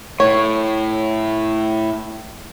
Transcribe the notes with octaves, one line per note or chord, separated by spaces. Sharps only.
A2 C#5